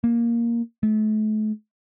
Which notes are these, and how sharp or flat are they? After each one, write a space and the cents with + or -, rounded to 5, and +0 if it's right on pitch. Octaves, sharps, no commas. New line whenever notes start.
A#3 +5
A3 -40